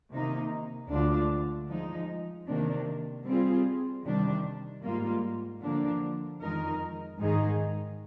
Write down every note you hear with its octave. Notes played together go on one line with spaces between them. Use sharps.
C3 D#3 A#3 D#4
D2 D3 G#3 D4 F4
F3 G#3 D#4
C3 D#3 A#3 D4
G3 C4 F4 G#4
C3 D#3 G3 D4
G#2 G3 A#3 F4
D3 F3 A#3 D4
F2 D#3 G#3 D#4 A#4
G#2 D#3 G#3 D#4 G#4